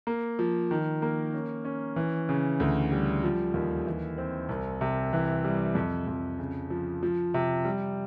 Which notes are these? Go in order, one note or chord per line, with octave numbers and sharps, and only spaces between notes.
A#3
F3
D#3
A#3
C#4
C#4
E3
C#3
D2
G3
F3
D#2
E3
C4
C2
C3
E3
G3
F2
F2
C#3
F3
F3
C3
G3